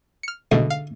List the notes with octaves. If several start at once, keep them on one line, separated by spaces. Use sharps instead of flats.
F6 C#7
D2 G#2 B2
F5